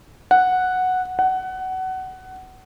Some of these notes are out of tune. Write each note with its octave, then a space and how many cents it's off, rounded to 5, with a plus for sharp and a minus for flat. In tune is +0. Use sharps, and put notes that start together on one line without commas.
F#5 -5
F#5 +20